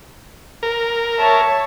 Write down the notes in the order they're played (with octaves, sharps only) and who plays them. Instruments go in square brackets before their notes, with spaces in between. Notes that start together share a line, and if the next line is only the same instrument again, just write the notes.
[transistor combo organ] A#4
[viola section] C#5 E5 A5